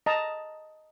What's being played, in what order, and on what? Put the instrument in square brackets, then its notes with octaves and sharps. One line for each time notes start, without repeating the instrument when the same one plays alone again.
[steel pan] D#5 A5 A#5